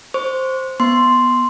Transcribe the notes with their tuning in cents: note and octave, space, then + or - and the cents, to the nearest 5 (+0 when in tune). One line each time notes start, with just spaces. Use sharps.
C5 +0 C#6 +20
B3 -15 C6 +0